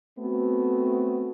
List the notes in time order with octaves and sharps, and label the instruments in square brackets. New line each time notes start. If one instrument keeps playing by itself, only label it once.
[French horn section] A3 B3 C4 F#4